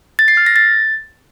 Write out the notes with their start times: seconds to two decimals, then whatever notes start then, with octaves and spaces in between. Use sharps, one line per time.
0.19 A6
0.28 C7
0.37 F6
0.47 A#6
0.56 A6